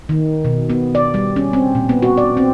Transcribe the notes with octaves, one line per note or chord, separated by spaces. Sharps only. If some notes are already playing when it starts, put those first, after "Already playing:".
D#3
B2
B3
D5
G3
C#4
C4
A#2
B3
F#4
D5
C4